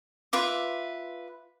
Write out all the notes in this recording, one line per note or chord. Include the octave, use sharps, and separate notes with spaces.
F4 B4 E5 D6